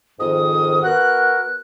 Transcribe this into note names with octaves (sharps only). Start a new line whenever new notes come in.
F2 G#2 D#3 D#6
B3 F#4 A#4 F#6